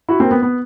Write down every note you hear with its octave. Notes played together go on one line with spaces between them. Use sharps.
E4 F#4
A#3 C4
B3
B3